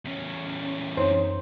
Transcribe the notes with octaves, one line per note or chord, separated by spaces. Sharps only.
E2 C#4
F#2 C4 D#4 C5 C#5